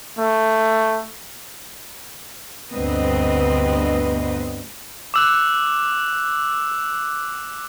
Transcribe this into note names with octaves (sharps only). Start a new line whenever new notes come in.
A3
D2 G2 B3 C4 B4 D#5
D6 E6 F#6